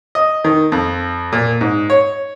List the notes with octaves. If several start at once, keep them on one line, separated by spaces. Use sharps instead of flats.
D#5
D#3
F2
A#2
G#2
C#5